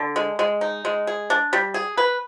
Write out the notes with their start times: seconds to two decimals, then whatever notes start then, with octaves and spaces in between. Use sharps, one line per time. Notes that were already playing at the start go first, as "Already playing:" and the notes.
Already playing: D3
0.16 G#3
0.39 G#3
0.61 D#4
0.85 G#3
1.07 G#4
1.30 D4
1.53 G3
1.74 G#4
1.97 B4